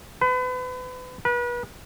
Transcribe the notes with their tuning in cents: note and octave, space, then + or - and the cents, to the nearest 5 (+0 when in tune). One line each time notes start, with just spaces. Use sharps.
B4 +35
B4 -35